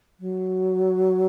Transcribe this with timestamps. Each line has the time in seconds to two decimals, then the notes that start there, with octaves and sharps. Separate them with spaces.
0.20 F#3